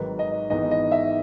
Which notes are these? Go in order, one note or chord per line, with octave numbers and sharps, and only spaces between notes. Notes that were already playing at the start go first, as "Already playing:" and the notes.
Already playing: G#1 G#2 D#3 F#3 B4
D#5
G#1 G#2 E3 B3 D#4 D#5
D#5
E5